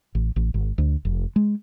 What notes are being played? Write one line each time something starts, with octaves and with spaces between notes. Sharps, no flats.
A1
A1
G#1
D2
F1
G#3